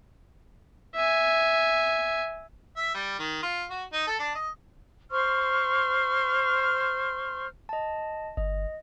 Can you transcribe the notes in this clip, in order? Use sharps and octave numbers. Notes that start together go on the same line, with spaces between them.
E5 G#5
E5
G3
D#3
F4
F#4
D#4
A4
D4
D#5
C5 C6 C#6 F6
D#5 A5
G1 D#5